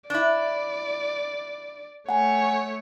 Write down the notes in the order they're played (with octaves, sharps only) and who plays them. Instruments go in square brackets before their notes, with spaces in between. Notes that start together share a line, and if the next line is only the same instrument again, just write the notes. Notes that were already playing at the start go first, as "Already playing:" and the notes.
[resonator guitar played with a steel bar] D4 E4 [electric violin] D5
[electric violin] A3 C#5 [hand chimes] F#5 G#5